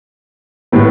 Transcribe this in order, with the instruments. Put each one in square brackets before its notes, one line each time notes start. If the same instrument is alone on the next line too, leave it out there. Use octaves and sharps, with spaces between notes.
[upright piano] A2 G3 B3